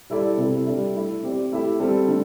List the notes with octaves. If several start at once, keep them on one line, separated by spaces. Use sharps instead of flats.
G3 E4 A4 D5
C3 G3 E4 A4
G3 D4 A4 E5
A3 E4 A4 E5
C4 G4 D5
A3 E4 G4 E5
G3 C4 A4
D3 A3